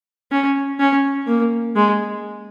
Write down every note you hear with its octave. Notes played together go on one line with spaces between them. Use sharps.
C#4
C#4
A#3
G#3